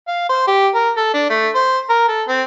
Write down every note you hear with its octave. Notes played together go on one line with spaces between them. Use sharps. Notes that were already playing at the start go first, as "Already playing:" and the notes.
F5
C5
G4
A#4
A4
D4
A3
C5
A#4
A4
C4